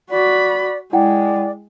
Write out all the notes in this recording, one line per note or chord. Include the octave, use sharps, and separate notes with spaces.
F#4 D5 B5
G#3 E4 D5 F#5 G5